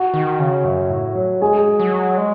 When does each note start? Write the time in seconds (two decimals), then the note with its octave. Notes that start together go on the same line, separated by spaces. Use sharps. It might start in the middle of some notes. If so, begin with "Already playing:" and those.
Already playing: F#4
0.14 D#3
0.39 C#3
0.65 F#2
0.90 A2
1.15 F#3
1.41 G#3 G#4
1.80 F#3
2.18 G#3